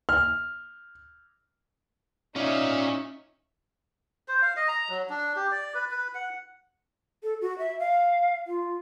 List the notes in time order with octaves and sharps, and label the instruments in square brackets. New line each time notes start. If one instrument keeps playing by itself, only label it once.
[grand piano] F6
[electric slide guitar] C#4 [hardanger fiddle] D#4 E5 [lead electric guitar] F4 D5
[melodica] C5
F5
D#5
A#5
F#3
D4
G4
D5
B4
B4
F#5
[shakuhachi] A4
F#4
E5
F5
F4